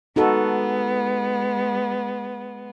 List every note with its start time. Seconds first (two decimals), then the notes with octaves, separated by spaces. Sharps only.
0.16 G#3 B3 D#4 F#4 A4